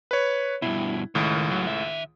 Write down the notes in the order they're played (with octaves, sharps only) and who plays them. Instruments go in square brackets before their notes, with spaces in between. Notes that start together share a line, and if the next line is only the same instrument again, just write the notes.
[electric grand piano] B4 C#5
[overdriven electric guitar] G2 B2 [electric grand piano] E4
[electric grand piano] C#2 A2 [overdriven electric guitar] D#3
[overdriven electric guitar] F#3
D#3 E5